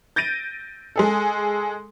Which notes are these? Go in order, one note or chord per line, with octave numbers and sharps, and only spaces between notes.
G6 A6 A#6 D7 D#7
G#3 G#4 A4